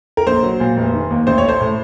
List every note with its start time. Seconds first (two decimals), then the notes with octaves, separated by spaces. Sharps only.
0.17 A#4
0.26 A#1 C5
0.43 F#3
0.60 A#2
0.77 F1
0.94 D#3
1.10 D#2
1.27 A1 C5
1.38 C#5
1.44 A3 C5
1.61 A2